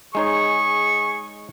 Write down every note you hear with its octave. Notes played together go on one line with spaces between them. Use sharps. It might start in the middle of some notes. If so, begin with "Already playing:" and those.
G#3 D#4 G#4 C#5 C#6